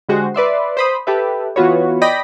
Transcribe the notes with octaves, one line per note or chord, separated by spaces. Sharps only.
D3 G#3 F#4 G4 C5
B4 D5 E5 C6
C5 B5 D#6
G4 A4 B4 E5
E3 B3 F4 F#4 B4 C#5
D5 D#5 G5 B5 A#6 B6